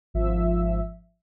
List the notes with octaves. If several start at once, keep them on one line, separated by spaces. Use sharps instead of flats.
G#1 F3 E5